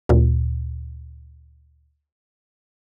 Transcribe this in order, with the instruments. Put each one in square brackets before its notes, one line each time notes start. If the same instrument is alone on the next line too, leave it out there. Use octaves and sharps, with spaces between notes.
[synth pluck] D2 A#2